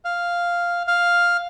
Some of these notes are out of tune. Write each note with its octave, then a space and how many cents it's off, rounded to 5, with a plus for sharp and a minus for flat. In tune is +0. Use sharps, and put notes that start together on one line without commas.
F5 +0
F5 +5